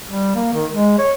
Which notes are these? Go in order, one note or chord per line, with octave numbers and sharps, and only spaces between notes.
G3
A#3
D#3
G#3
C#5